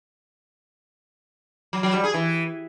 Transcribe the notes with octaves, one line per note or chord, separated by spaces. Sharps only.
F#3
F#3
G3
G#4
E3